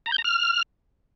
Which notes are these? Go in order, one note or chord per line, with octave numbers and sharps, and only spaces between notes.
A#5
G6
A#5
F6